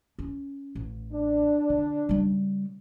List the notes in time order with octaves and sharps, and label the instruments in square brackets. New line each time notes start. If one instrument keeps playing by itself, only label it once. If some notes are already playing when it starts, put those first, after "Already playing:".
[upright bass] C#4
A1
[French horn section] D4
[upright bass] D3
C#3 G3